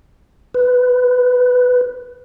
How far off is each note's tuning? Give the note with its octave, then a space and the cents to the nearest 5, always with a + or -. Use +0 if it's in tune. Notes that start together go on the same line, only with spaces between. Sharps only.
B4 +10